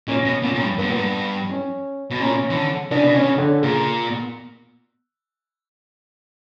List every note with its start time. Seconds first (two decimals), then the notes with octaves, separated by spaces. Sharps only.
0.08 A#2 C#4
0.25 B2
0.43 A#2 C#4
0.55 A#2
0.61 G2
0.78 G2 B3
0.89 A#2
0.98 G2
1.50 C#4
2.10 B2
2.20 A#2 C#4
2.50 E3
2.56 D3
2.91 C#3 D4
3.03 B2
3.14 C#3 C#4
3.38 D3
3.62 A#2 C#3